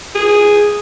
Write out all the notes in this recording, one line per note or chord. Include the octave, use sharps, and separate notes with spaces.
G#4